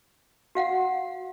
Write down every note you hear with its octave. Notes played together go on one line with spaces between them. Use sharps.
F#4 F5 F#5